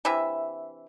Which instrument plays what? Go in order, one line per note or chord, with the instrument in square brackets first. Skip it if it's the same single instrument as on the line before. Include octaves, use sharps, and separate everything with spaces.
[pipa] C3 E3 D4 E5